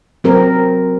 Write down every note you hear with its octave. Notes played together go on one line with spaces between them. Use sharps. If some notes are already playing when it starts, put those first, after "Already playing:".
F#3 C4 A#4